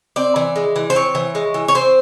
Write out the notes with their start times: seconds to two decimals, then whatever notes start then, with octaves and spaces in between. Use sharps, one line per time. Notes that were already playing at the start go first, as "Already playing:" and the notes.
0.16 C4 D5
0.36 E3
0.56 G#3
0.76 E3
0.90 C5
0.95 C4 C#5
1.15 E3
1.35 G#3
1.54 E3
1.68 C#5
1.75 C4 C5